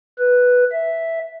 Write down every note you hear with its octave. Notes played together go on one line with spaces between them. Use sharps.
B4
E5